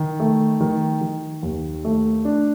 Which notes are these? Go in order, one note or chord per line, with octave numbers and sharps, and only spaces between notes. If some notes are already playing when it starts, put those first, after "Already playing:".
Already playing: D#3
A3
D#3
D#3
D#2
A3
D4